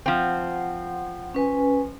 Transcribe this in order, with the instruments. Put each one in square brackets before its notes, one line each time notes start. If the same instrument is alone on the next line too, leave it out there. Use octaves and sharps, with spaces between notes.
[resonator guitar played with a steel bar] F3 C4 [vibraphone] F#5
[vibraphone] C#4 B4 G#5